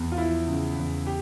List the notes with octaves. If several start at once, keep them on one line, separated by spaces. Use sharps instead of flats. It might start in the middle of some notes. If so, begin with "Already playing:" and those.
Already playing: E2
F4
F3 E4
C#3
E2
G4